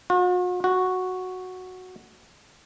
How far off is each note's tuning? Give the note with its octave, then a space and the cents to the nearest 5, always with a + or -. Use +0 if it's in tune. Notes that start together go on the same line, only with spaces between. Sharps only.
F#4 -45
F#4 -5